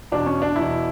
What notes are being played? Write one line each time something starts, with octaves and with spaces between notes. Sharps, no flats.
E2 B2 D4
C#4
D4
E2 B2 E4